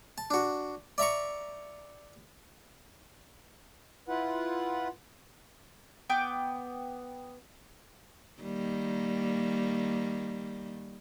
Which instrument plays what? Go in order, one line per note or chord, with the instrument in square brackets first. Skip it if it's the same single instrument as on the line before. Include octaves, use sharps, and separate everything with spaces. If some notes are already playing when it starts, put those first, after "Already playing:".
[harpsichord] A5
D4 F#4
D5 E5 A#5 C#6
[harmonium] E4 F4 B4 F#5
[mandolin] B3 G5 D6 G6
[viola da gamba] D#3 G3 A#3